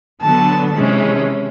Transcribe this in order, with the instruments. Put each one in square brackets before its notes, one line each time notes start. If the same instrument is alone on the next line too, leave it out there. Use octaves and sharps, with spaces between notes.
[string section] D3 F#3 B3 [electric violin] A5
[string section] C3 E3 G#3 C#4